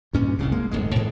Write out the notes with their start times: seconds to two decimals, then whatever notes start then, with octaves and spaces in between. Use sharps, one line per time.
0.13 D2 G2 A#2 C#4
0.39 F#1 C2 C#3
0.52 G#3 A#3
0.71 D1 D#2 G#2 G#3
0.96 G#2 B2 E3 G#3